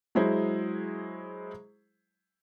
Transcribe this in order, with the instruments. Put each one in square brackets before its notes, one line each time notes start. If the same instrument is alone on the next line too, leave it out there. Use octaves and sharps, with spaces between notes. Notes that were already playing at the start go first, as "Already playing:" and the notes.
[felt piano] F#3 G#3 E4 G#4 C5